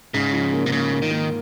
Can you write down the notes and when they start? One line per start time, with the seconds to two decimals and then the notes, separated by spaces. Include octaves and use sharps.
0.14 G#2 C#3
0.33 F3
0.53 A#3
0.66 C3
0.72 C#3 A#3
0.91 A#3
1.02 D#3
1.11 A#3